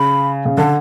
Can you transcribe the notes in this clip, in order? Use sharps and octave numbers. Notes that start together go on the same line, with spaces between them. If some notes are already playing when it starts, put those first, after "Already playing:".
Already playing: C#3 B5
C#3
D3 A5